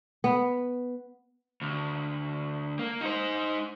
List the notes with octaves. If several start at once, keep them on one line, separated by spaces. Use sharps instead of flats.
B3
D2
A#3
D#4 C5